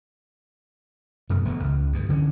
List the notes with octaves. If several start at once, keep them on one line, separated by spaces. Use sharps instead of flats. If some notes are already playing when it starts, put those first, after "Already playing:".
F1 F#2 B2 A3
E1 D2 A3 B3
C#2
D2 G2
D3 E3 C4 C#4